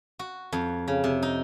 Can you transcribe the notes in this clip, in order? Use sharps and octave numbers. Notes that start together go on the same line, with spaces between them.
F#4
F2
C#3
C3
D#4